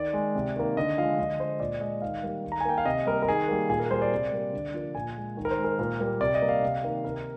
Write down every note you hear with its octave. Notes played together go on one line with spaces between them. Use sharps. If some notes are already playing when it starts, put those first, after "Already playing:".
Already playing: D#3 D5
G#3
C3
D#3 A#3
D3 D#5
F3 G#3 F5
D3 D#5
G#3 C5
A#2 D5
G#3 D#5
D#3 F5
G3 A#3
D#3
A#5
G#5
A#3 G5
F5
C3 D#5
G3 A#3 A#4
A#4
D#3 G#4
G3 A#3
A#2 G#4
A#4
G3 A#3 C5
D5
C3
G3 A#3
D3
F3 A#3
A#2 G#5
G#3
D#3
A#4
C5
G#3
A#4
A#2 A#4
G3 A#3
C3 D5
D#5
G3 A#3
F5
C3
D#3 A#3
C3 A#4